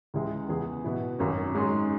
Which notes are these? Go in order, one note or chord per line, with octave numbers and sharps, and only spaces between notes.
C#2 C#3 E3 G#3 E4
E2 E3 B3 G#4
B2 B3 E4
G#1 F#2 F#3 C#4
G#2 G#3 C#4 G#4